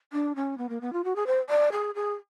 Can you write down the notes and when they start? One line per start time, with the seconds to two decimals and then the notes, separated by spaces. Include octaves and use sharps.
0.13 D4
0.36 C#4
0.58 B3
0.69 A#3
0.81 B3
0.93 F4
1.04 F#4
1.16 G#4
1.26 C5
1.50 D5
1.72 G#4
1.95 G#4